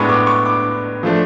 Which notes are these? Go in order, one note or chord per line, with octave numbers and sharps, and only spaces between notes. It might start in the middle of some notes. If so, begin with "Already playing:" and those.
Already playing: A2 G#3 B3 D4 C#6
D6
C#6
D6
F3 A3 D4